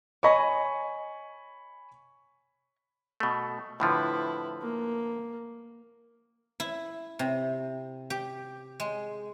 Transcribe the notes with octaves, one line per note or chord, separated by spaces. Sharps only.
C#5 D#5 G#5 B5 C#6
B2 A3
A2 D3 F3 E4 B4
A#3
E4
C3
G4
G#3